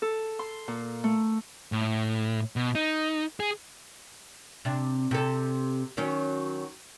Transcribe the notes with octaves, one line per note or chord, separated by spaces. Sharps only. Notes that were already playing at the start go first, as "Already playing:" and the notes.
A4
C6
A#2
A3
A2
B2
D#4
G#4
C3 D4
C3 A4
D#3 F#3 C#4